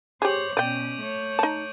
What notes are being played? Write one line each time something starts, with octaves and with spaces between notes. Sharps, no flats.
G4 G#4 C5 C#5 D6 G6 F#7
B2 C#4 D5 G5 G6 D7 D#7
A3 C#5 D6
D#4 A5